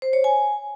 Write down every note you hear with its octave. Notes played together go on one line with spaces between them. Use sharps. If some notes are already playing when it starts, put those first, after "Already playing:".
C5
C#5
G#5